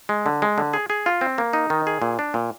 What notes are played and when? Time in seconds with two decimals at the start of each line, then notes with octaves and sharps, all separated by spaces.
0.09 G#3
0.26 D3
0.42 G#3
0.58 D3
0.73 G#4
0.90 G#4
1.06 F4
1.21 C4
1.38 A#3
1.53 D#4
1.70 D#3
1.87 G#4
2.02 A#2
2.19 D4
2.34 A#2